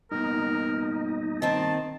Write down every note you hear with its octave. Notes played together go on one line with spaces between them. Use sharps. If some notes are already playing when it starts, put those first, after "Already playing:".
G2 B2 A#3 D#4 A#4
D#3 C4 A5